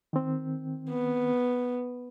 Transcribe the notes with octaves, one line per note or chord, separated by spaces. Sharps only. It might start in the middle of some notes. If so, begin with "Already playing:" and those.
D#3 C4
B3